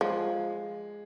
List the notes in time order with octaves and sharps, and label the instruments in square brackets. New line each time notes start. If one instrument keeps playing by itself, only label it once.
[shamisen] F3 [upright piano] G#3